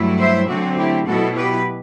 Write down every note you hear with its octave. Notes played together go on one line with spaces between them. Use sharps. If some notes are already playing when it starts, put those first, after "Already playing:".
Already playing: G2 F#3 A3 E4
C5 E5
D3 F#3 A3 C4 F#4
E4 G4
B2 F#3 B3 E4 F#4 A4
G4 B4